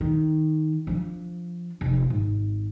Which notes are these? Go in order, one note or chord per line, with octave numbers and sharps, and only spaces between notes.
D#3
F3 D4
F1
G#1